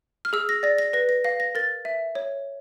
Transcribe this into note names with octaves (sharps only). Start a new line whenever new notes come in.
F6
G#4 E6
A#6
D5 A#6
A#6
B4 A#6
A#6
F5 A#6
A#6
A#4 A6
E5
C#5